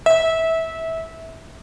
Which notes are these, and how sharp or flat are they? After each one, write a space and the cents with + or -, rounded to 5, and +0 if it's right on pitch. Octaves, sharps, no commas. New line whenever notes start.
E5 -20